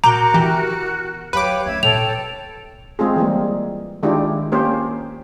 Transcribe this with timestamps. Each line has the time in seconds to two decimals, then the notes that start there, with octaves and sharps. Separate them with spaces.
0.04 A#2 F#4 A#4 A#5 D6 G6
0.34 E3 B3 G4
1.33 F#3 G4 B4 C#5 F5 D6
1.66 A3 C#4 E5 G#6
1.83 A#2 D#4 A4 C#5 G5 F7
2.99 G#3 C4 F4 G#4
3.16 E3 G3 A#3
4.03 D#3 G#3 D4 E4 F4 G4
4.52 A#3 C#4 G4 C5